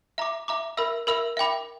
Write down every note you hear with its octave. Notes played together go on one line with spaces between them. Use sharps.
E5 A#5 D6
E5 A#5 D6
A#4 E5 B5 E6
A#4 E5 B5 E6
E5 G5 B5 D6